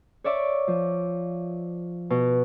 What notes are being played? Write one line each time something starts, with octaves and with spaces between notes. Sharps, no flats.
C#5 D5 E5 D6
F3
B2